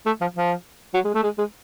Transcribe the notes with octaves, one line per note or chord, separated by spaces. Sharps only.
A3
F3
F3
F#3
G#3
A3
G#3
G#3